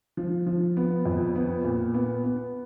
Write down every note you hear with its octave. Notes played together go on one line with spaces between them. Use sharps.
F3
F3
B3
F2
B3
A#2
B3
B3